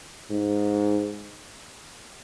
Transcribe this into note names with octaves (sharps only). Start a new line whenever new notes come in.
G#2